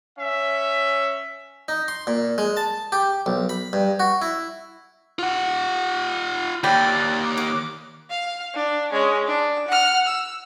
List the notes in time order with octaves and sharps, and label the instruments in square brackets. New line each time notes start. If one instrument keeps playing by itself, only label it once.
[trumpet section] C#4 E5
[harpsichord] D#4
C6
A#2
G#3
A5
G4
B1
B5
G2
F#4
E4
[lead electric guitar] F4 F#5
[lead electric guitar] D#2 [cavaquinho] D5 G5 B5
[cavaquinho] D6
[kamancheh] F5
D4
G#3 C#4
D4
F#5 F6
E6